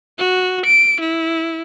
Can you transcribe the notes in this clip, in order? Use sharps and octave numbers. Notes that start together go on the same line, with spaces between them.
F#4
D7
E4